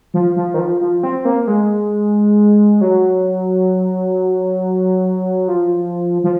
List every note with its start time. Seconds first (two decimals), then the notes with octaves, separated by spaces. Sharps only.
0.14 F3
0.36 F3
0.54 D#3
0.59 F3
0.81 F3
1.03 C4
1.25 A#3
1.47 G#3
2.81 F#3
5.48 F3
6.24 F3